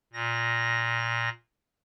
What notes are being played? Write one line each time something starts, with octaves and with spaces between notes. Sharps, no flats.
A#2 A#6